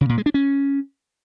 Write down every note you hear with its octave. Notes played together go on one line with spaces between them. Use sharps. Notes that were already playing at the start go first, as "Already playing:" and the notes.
C#3
A#2
G#3
D4
C#4